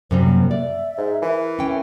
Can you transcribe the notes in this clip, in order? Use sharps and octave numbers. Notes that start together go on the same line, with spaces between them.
F#2 C3 G3 C5
A#3
D5 E5
G#2
E3 A#4
C#4 G5